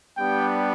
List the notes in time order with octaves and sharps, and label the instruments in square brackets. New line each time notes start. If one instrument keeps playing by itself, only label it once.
[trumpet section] G3 B3 D4 G4 G5